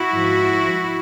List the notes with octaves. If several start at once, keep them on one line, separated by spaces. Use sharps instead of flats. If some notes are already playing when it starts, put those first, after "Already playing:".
Already playing: E4 F#4
G#2 F3